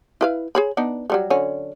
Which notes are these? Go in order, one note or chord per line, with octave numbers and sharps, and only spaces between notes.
E4 B4 F5
G#4 C#5 B5
B3 D4 D#4
F#3 G3 A3
D3 F#3 C#4